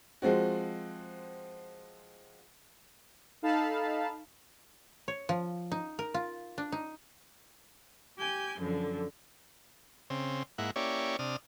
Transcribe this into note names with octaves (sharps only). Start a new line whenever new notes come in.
F3 G#3 C4 F#4
D#4 A4 F5 A5 B5
C#5
F3
D#4
A#4
F4
D4
D#4
G4 G#5 G6
F#2 D3 F3
C#3 C4
G#2 A#3 E4 F#5
A#3 C#4 E4 G4 C#5 D5
C3 D4 D#6 F6